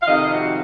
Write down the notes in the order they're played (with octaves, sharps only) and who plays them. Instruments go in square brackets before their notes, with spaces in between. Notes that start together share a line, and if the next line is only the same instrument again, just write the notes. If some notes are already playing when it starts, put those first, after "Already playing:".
[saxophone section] F5
F2 C3 D#3 D#5
F#4